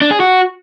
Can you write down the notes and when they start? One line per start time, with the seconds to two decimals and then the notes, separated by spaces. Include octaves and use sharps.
0.01 D4
0.11 G#4
0.20 F#4